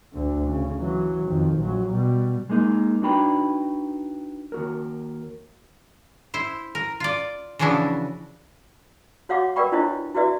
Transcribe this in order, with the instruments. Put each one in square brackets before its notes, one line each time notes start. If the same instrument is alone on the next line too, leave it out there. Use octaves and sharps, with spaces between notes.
[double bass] D2 D3
C#3
E3 F#3
F2 D#3
A#1 F#3
B2 G3
[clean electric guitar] G#3 A#3 D#4
D4 D#4 F#4 B4 G5 B5
D#2 F#4 A#4
[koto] E4 C5
A#4
F4 D5
C#3 E3 F3 D4 E4 F#4
[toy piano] F#4 C#5 F5 F#5 D6
A#4 B4 D5 G5 B5 C#6
D4 E4 F4 C5 C#5 D#5
E4 F#4 G4 B4 D5 E5